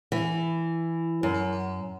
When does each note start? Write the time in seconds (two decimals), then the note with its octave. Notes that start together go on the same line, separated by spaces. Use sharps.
0.12 E3
1.23 F#2